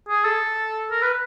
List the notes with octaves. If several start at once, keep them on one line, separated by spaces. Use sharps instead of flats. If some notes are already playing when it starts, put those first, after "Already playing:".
G#4
A4
A#4
B4